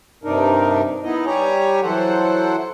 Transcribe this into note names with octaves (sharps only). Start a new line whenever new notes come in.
G2 C3 D4 D#4 A#4
B3 D#4 E4 D#5
G3 G4 C#5 G#5 A#5
E3 F#3 A4 C5 F#5